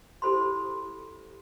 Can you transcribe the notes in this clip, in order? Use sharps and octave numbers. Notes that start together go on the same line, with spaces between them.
E4 G4 A4 C5 B5 C6